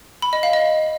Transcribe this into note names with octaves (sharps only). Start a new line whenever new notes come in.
B5
D#5
F5
D#5